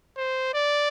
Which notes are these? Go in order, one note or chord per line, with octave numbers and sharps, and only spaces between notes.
C5
D5